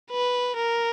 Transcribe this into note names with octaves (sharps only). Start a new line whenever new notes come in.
B4
A#4